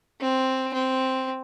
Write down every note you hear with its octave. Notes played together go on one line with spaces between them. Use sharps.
C4
C4